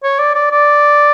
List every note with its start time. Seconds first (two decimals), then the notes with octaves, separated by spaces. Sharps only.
0.03 C#5
0.19 D5
0.35 D5
0.51 D5